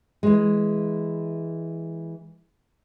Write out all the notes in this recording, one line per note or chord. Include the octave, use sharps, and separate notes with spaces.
E3 G#3